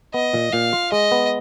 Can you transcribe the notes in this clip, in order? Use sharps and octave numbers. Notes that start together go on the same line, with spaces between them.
B3 D#5
A#2
A#2 F5
F4
G#3 D#5
B3